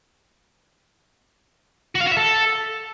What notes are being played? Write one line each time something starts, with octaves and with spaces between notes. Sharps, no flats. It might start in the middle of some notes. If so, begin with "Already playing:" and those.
F#4
F5
F#4
E5
A4